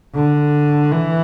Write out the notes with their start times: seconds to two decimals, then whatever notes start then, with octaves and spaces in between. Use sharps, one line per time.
0.15 D3
0.92 E3